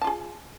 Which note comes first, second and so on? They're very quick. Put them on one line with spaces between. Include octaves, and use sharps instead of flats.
A5 F4 G#4